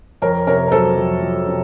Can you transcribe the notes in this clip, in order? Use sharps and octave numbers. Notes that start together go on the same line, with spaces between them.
F2 A#4 C#5
C3 A#4 C#5
A#4
F#3 A4 C5
F2
F2
C3